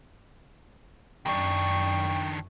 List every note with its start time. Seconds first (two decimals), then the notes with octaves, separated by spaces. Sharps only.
1.26 F#2 D#3 D4 G5 C#6